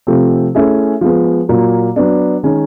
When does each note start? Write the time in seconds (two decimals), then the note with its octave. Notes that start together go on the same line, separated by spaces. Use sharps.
0.07 C3 F3 A3 C4
0.55 A3 C#4 E4 G#4
1.01 F3 G#3 B3
1.49 A#2 F#3 A#3
1.96 F#3 B3 D4
2.43 D#3 G#3 C#4